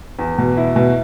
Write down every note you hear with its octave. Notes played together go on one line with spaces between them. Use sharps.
E2
B2
E4
B2